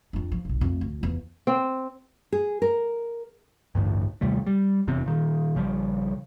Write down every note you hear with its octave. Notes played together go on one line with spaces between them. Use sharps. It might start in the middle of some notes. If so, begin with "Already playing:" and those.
F2 D4
F3
F1 B1
F2 A3
D2
E2 F3
C4
G#4
A#4
A1 D2 G2
D#2 C3 G3 A3
G3
F1 E2 C3 C4
A#2 D#3
A#1 C#3 F3 G3